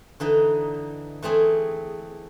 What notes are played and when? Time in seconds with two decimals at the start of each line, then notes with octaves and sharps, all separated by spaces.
0.20 D3 E3 D#4
1.23 E3 A3 C4 G#4